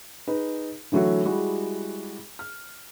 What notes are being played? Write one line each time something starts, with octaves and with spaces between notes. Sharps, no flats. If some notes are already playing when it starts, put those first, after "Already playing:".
D#4 G#4 B4
D3 E3 F#3 A3 F#4
G3 G#3 E4 F#4
F6